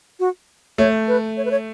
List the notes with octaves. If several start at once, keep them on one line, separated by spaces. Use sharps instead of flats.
F#4
A3 C#5
B4
C#5
B4
C#5